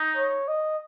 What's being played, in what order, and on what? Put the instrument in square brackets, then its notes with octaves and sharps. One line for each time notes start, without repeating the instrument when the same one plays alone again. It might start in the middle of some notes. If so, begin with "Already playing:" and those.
Already playing: [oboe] D#4
[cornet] C#5
D#5